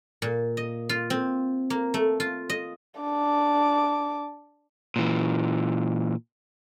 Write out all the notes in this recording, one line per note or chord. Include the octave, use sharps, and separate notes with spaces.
A#2
D#5
F4
C4
A#3
A3
F4
D#5
D4 D6
A#2 E3